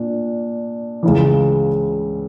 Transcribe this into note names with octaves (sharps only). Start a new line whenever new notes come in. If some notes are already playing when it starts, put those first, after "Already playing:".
Already playing: A#2 D4
C#2 C#3 E3